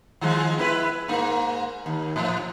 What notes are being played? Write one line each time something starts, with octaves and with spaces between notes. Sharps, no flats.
D#3 F3 G#3
B3 E4 B4
G#2 A#3
D#2
A2 F3